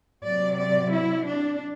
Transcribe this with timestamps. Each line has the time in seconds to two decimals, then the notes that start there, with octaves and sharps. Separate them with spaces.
0.24 C3 F#3 D5
0.58 D5
0.92 E4
1.26 D4